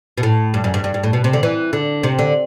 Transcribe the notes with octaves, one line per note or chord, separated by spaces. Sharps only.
B2
A2
G2
F#2
G2
G2
G2
A2
B2
C3
D3
E3
D3
C3
D3